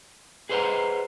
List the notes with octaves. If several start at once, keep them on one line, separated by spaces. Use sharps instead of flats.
G#4 B4 C5 D#5 F#5 A#5